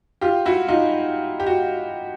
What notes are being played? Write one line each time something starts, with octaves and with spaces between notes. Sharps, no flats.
F4 G4
E4 F#4
D#4 F4
G4
F#4